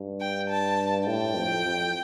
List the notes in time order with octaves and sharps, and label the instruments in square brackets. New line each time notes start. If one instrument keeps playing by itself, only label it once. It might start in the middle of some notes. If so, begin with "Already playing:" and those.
Already playing: [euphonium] G2
[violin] G5
A5
[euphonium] A2 [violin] G5
[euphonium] F2
F2